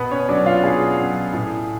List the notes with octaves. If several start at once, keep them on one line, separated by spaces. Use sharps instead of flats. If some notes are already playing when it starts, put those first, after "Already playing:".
Already playing: B2 B3 B4
C#4 C#5
F#3 C#4 D4 D5
F4 F5
B2 G#4
F#3 C#4
A2